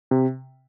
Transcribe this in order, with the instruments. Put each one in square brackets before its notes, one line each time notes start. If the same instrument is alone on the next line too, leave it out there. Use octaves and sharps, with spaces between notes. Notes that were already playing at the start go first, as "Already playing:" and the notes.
[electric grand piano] C3